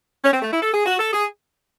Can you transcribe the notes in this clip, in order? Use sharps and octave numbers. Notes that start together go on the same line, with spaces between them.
C#4
C4
A3
E4
A4
G#4
F#4
A4
G#4